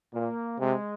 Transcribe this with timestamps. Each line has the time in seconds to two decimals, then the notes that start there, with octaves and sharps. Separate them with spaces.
0.14 A#2 A#3
0.59 C3 G#3